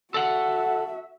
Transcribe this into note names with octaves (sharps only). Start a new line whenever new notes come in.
F#4 A4 E5 F#5